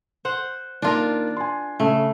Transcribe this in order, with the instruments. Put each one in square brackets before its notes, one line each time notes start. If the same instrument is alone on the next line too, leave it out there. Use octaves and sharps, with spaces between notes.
[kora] C5 F#5
[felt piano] D#3 A#3 [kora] D4 F4 A#4
[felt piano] G#5 C6
[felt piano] C#3 [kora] A3